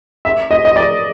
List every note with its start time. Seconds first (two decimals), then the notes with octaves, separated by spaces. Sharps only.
0.25 E5
0.51 D#5
0.65 D#5
0.76 D5